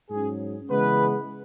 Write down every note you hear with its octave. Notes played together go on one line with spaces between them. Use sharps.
G#2 F#3 C#4 G#4
C#3 E3 G#3 B3 B4